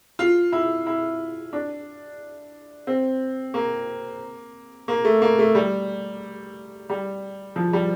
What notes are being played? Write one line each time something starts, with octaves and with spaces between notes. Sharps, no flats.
F4
E4
E4
D4
C4
A#3
A#3
A3
A#3
A3
G3
G3
F3
G3